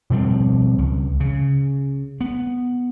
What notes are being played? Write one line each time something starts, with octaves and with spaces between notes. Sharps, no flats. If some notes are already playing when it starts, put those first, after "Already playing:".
B2 F3 G3 C4
C#2
C#3
B3